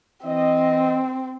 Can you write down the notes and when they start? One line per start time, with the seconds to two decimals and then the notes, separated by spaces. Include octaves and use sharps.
0.25 E3 C4 D#5